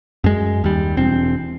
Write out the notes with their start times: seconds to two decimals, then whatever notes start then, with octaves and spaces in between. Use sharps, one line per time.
0.24 F#2 G#3
0.64 D#2 G3
0.97 E1 C4